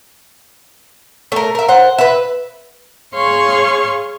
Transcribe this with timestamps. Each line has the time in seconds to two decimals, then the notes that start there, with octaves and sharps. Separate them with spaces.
1.32 A3 A#4
1.55 A#4 E5
1.68 C5 F#5
1.98 B4 E5
3.13 G#4 C#5 F5 C6 C#6